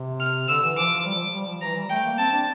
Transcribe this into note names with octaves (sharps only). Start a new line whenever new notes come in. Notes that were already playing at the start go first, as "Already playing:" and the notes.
Already playing: C3
F6
D3 E6
E3
F3 D6
G3
F3
G3
F3
E3 A#5
G3
A3 G5
A#3
C4 A5
D4